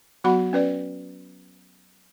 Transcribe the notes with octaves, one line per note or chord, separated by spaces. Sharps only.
F#3 B3 F#4 F#5 B5
C#4 B4 D5